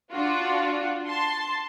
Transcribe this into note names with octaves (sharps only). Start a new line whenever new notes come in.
D4 F4 F#4
A5 C6